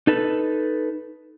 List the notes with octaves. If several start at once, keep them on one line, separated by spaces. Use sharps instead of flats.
D#4 A4 B4